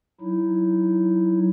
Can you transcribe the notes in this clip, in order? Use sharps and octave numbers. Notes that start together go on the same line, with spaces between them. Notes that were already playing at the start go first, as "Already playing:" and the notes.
F#3 D#4 E4